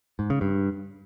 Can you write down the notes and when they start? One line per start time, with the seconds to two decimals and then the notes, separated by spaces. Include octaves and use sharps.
0.19 G#2
0.30 C#3
0.41 G2